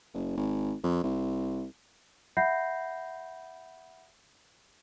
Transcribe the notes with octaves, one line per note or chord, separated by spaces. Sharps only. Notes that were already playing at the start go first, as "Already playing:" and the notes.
F#1
G#1
F2
C2
E5 F#5 B5 G6 A#6 C7